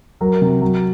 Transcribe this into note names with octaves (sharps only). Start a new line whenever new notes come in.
F#3 A#4
C3
F#3